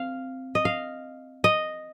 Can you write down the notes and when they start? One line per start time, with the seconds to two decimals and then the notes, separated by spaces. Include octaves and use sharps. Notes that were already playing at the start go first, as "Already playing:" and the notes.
Already playing: C4 F5
0.55 D#5
0.65 F5
1.44 D#5